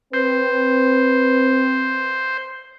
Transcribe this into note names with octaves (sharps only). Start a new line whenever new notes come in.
C4 B4 C5